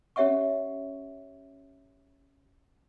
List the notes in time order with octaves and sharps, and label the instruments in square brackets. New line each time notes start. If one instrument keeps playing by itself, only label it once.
[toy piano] C#4 G4 C#5 E5 F#5 C#6